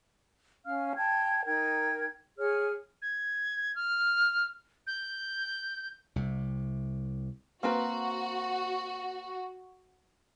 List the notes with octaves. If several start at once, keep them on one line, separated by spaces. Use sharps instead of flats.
C#4 F5 F6
G5 A5 G#6
D#4 A#4 G5 G#6
G#4 C#5 F6
G#6
F6
G6
C2 C3
A#3 C4 F#4 B4